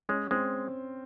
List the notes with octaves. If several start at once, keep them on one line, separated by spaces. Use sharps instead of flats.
G#3 C#4
G#3 C4